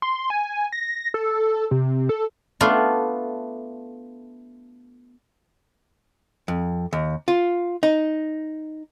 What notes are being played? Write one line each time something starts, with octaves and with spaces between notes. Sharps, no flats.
C6
G#5
A#6
A4
C3
A4
A3 B3 D4 F4
F2
D#2
F4
D#4